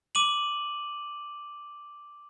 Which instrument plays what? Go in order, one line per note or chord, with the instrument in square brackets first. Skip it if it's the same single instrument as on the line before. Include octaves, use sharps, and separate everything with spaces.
[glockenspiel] D6 D#7 F#7